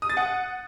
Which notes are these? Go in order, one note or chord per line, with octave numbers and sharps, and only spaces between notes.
D#6
A6
F#5